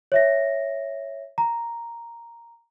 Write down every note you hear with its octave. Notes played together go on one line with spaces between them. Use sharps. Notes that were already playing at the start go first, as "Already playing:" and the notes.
C#5 E5 A#6
A#5